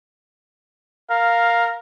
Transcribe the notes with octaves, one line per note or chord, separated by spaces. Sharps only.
A#4 F5